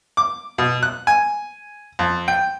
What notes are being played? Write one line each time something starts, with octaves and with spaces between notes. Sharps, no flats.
D6
B2
F#6
G#5
F2
G5